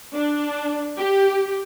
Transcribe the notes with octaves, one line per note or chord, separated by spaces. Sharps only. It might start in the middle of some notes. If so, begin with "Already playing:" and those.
D4
G4